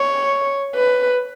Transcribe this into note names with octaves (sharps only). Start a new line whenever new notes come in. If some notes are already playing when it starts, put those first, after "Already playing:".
Already playing: C#5
B4